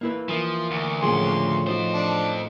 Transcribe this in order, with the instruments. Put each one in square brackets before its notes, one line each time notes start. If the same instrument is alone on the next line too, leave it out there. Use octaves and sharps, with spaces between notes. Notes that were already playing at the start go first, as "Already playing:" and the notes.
[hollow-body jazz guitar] A#3 E4 B4
[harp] E3 A#4 D#6 [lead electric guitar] F3
[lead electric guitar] D2
[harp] A2 C#3 F3 [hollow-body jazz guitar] G#4 [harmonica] C6
[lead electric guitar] F2 C5 [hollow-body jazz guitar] F3 F#4 [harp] D#4
[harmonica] D4